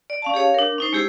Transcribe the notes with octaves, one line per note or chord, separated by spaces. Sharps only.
D5
C#4 F5 A5
G4 G#4 C#5 F5
D4 A#4
C#4 D#4 C5
G#3 E4 G4 G#4 C5